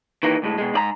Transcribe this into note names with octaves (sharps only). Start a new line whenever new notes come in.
D#3 E3 A#3 D#4
D2 A2 G#3
B2 G#3
G#2 D5 A#5